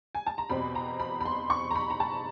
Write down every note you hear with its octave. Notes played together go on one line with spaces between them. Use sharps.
G#5
A5
A#5
E2 B2 G3 C4 B5
A#5
B5
B5
C6
C#6
A#5
B5
A#5
A5